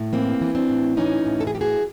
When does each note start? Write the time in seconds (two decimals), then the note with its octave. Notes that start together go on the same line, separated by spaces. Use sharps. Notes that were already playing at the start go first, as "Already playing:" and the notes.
Already playing: A2
0.13 E3 A#3 C4
0.41 E3
0.55 C4 D4
0.69 A2
0.97 E3 C#4 D#4
1.26 A2
1.40 A4
1.47 G#4
1.54 E3 G4
1.61 F#4 G#4